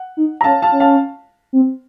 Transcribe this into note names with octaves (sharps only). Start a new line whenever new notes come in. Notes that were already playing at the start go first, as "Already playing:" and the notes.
Already playing: F#5
D#4
A#5
C#4 F5 A5
F5 A5
C#4
F5 A5
C4